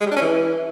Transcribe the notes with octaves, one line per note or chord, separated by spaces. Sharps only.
G#3
G3
D4
C#4
E3